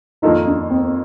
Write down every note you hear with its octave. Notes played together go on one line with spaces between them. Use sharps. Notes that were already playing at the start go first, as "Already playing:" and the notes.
F2 D#3 A#3 D#4 F4 A4
D4
C4
C4